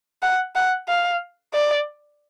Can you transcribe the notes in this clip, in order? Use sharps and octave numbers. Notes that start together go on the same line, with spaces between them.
F#5
F#5
F5
D5